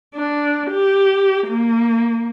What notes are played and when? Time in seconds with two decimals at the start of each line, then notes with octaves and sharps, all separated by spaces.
0.15 D4
0.70 G4
1.48 A#3